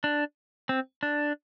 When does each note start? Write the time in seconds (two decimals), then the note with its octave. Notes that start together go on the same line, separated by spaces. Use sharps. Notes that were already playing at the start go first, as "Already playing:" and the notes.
0.04 D4
0.69 C4
1.03 D4